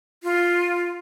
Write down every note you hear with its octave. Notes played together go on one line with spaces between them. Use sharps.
F4